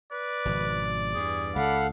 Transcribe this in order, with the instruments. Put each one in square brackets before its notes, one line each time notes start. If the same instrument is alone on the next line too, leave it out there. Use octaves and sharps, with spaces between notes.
[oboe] B4 [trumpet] D5
[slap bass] G#1 B2 F3
[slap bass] E2 G2 [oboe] G#4
[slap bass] C#2 [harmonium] A4 F5 F#5 [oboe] B5